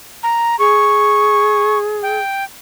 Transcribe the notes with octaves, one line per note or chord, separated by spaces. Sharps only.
A#5
G#4 C#6
G5